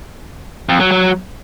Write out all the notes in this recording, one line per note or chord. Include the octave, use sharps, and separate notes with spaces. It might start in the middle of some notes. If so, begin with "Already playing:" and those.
F2
F#3
F#3